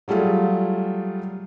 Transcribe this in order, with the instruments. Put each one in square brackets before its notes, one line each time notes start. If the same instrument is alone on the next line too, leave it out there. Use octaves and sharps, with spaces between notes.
[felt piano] F#3 G3 A3 F4 G#4